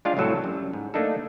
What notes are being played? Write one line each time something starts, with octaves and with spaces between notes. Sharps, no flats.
G#3 D4 F4 D5 F5 G5
C2 A2 F#3 C4 A4
F#2 G3
G#2
A3 A#3 D4 D#4 A4